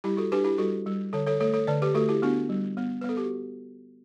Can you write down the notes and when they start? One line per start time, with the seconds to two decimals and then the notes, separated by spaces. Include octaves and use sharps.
0.04 G3 E4 G4
0.17 F#4 A4
0.32 D4 G4 B4
0.45 E4 G4
0.58 G3 F#4 A4
0.86 G3
1.13 D3 A4 C#5
1.26 A4 C#5
1.40 A3 A4 C#5
1.54 A4 C#5
1.67 D3 B4 D5
1.82 G4 B4
1.95 A3 F#4 A4
2.09 E4 G4
2.22 B3 D4 F#4
2.49 G3
2.77 B3
3.01 B4
3.04 B3 A4
3.17 G4
3.24 F#4